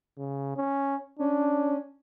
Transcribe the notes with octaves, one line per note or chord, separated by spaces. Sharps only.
C#3
C#4
C#4 D4